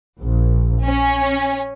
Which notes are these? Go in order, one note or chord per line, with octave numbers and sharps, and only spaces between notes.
A#1
C#4